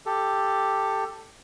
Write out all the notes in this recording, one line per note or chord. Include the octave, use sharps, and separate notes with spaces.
G4 A4